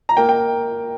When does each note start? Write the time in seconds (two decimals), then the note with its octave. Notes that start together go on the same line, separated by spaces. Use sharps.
0.09 A#5
0.17 A#3 G5
0.29 G5